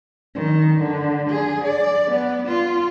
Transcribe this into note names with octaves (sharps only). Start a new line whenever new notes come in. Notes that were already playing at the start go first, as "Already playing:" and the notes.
D#3
D3
G#4
D5
B3
F4